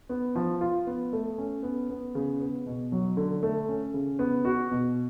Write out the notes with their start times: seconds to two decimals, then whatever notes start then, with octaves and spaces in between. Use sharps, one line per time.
0.09 B3
0.35 F3
0.61 F4
0.87 B3
1.13 A3
1.38 C#4
1.63 B3
1.90 B3
2.15 C#3
2.40 B3
2.66 B2
2.92 F#3
3.17 D3
3.43 A3
3.68 C#4
3.94 C#3
4.19 B3
4.45 F#4
4.71 B2